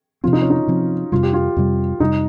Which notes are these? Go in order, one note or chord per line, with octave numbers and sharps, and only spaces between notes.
C3 F3 C4 F4
D#4
C#4
D#4
C3 F3 C4
F2 C3 G3 F4
G4
F4
F2 C3 G3
F2 C3 G3 D#4